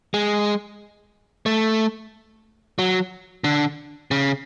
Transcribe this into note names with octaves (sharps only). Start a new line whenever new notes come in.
G#3
A3
F#3
D3
C#3